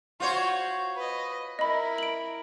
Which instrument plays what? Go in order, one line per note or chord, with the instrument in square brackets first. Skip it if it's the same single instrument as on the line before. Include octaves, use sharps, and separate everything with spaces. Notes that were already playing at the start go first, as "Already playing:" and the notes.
[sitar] F4 C5 C#5 [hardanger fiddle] F#4
[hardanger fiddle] B4 D#5
[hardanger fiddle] E4 A#4 [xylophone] D#5 B5
[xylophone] D7 F#7